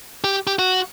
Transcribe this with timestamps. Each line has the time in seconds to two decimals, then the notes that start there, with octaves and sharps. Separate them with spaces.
0.24 G4
0.47 G4
0.59 F#4